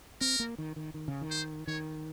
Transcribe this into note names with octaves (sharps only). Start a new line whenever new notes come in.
C4 A#4
A#3
D#3
D#3
D#3
C#3
D#3
C5
D#3 C#5